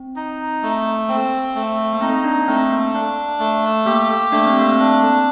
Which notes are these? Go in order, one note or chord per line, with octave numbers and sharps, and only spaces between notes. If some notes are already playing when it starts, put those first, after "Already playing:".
Already playing: C4
D#4
A3
A#3 C4
A3
A#3
C4 D#4
D4
A3 C4
A#3
D4
A3
A#3 G4
A3 D4
C4
A#3
C4
D4